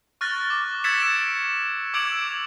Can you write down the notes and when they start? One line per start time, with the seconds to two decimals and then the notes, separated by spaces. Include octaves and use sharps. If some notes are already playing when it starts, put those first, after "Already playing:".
0.21 C#6 F6 F#6 A6 A#6
0.50 D6
0.84 E6 G#6 A6 B6 C#7 E7
1.00 E6 D7 E7
1.94 D6 E6 G#6 D7 F7 F#7